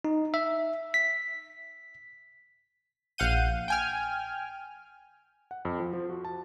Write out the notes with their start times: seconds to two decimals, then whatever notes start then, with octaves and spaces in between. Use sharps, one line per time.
0.05 D#4
0.34 E5
0.94 B6
3.18 A#1 F5 F#5 G6 D#7
3.68 G5 G#5 F6
5.51 F#5
5.65 F2
5.80 F3
5.93 F3
6.10 F#4
6.25 A5